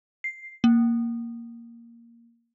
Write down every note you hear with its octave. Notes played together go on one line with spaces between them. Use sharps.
C7
A#3